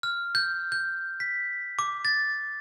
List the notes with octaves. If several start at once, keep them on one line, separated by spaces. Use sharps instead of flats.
F6
G6
G6
B6
D6
A6